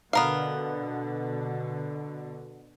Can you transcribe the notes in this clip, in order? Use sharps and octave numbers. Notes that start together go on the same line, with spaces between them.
B2 D3 B3 A#4 F5